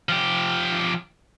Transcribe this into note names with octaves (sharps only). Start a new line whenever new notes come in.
F3 G4